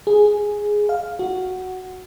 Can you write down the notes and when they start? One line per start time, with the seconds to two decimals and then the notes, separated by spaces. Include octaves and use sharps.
0.07 G#4
0.89 F5
1.19 F#4